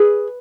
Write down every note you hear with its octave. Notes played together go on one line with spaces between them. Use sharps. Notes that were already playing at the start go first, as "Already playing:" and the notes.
Already playing: G#4 B4